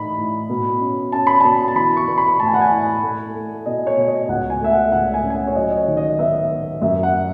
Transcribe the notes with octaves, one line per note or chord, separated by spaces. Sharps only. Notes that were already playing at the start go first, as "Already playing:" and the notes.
Already playing: A2 E3 D#4 B5
A2
B2
C#4
C#4 A5
B5
B2 A5
A5
E3 B5
C#6
B3
B5
A2 A5
G#5
F#5
G#5
E4
A3
A3
B2 D#5
C#5
B2
D#5
C#2 F#5
G#5
A3 E5
F#5
C#2 F#5
G#5
C#4
G#5
F#5
C#5
F#3 D#5
D#5
C#5
D#3
D#5
B3 E5
B3
F#2 E5
F#5